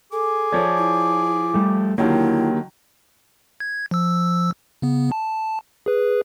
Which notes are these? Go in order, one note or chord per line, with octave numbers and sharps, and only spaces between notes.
G#4 A4 D6
F3 C#5 D5 G#6
E4
G3 A3
D3 D#3 F#3 A#3 E4 G4
G#6
F3 E6
C#3 B3
A5
G#4 B4